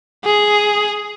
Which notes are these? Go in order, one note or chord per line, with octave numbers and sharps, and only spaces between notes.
G#4